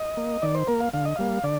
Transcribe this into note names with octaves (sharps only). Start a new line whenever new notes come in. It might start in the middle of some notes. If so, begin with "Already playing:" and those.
Already playing: D#5
A#3
D#3 D5
C5
A#3 A#4
F5
D3 F5
D#5
G3 A#3 F5
D3 D5